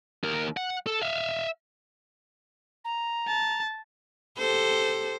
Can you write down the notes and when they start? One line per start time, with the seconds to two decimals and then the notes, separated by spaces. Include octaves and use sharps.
0.24 D#2 A#4
0.57 F#5
0.87 A4
1.02 E5 F5
2.84 A#5
3.27 A5
4.38 G4 A4 C5